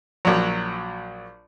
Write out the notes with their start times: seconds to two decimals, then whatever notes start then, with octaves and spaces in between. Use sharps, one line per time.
0.25 A#1 F#3